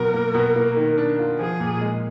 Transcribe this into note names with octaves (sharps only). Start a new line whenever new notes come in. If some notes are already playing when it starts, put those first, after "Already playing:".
Already playing: B2 F#3 A#4
A#3
B2
A#3
D#3
D4
F4
F3 G#4
A#2
G#3